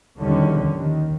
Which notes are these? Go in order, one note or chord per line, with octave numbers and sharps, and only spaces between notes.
E2 D3 D#3 F3 G3 C#4
D#2 D#3